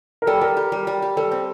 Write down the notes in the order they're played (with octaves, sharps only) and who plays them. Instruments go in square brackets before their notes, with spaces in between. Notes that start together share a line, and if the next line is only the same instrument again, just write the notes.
[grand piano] A#4
[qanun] G3 [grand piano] A4
[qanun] G3 [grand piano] A#4
[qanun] G4
G3
G3
G4
[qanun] G3 [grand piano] A4
[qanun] C4